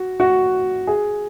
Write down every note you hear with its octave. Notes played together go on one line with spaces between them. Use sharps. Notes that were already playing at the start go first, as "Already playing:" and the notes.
Already playing: F#4
F#4
G#4